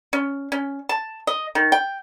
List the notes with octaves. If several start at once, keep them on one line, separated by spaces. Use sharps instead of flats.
C#4
C#4
A5
D#5
D#3
G5